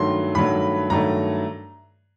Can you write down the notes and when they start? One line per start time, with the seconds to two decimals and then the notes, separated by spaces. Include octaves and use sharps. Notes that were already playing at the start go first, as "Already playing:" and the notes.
Already playing: G2 D#3 F#3 A3 C6
0.35 G2 D#3 F#3 A3 B5
0.90 G2 D#3 F#3 A3 A#5